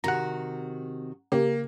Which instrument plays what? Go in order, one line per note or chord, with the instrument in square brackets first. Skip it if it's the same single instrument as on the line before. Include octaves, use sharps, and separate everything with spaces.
[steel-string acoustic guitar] C3 D#3 F#4 [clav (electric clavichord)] F#5 A#5
[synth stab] C#3 G4 [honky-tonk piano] A#3